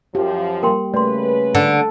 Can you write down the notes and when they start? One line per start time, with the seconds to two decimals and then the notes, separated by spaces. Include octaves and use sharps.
0.15 F#2 F3 G4
0.63 G3 A#3 A#4 G5 C6
0.94 C#3 A3 B4 D5 C6
1.55 D3